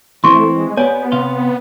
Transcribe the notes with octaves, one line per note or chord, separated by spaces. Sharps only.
E3 A3 C4 E4 C6 C#6
G#3
B3 G4 C#5 D5 G#5
C3 F5 C6